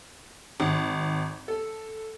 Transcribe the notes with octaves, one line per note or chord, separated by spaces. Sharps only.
G#1
A4